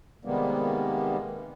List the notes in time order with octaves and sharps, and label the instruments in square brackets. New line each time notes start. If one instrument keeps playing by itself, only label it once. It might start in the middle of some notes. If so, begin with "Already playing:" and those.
[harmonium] C3 D#3 G3 G#3 A#3 B3